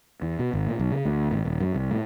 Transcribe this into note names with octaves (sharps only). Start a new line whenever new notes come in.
E2
B2
G#1
A#2
B1
C#3
D2
A1
D#1
F#2
C2
A2